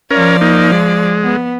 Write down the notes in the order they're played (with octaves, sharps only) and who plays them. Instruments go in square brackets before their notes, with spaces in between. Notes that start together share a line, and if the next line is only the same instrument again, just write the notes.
[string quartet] F3 D5 [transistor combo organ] C#4 A#4
[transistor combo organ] A#3 D#4
G#3
[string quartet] B3